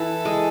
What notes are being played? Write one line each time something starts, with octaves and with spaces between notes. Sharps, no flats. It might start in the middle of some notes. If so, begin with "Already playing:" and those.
Already playing: E3 A4
G#3